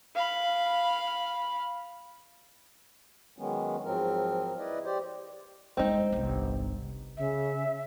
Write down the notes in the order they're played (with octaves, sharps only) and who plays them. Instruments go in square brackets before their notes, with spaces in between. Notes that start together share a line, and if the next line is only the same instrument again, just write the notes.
[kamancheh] F5 B5
[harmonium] D#3 F#3 G#3 B3 C#4
G#2 F3 F#3 C4 A#4
E4 B4 D5 D#5
G4 C5 D5
[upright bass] G1 G#3 [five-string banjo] C4 D#4
[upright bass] G1 C2
[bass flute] C#3 [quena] E5